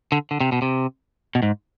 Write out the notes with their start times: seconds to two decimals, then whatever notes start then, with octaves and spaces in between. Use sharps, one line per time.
0.12 D3
0.31 D3
0.41 C3
0.52 B2
0.62 C3
1.35 B2
1.42 G#2